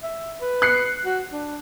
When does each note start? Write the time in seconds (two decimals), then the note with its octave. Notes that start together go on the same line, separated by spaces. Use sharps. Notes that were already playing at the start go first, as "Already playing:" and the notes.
0.03 E5
0.42 B4
0.62 F#6 C7 C#7
1.06 F#4
1.32 D4